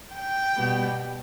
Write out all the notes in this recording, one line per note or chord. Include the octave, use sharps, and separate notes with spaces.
G5
B2 G3 B3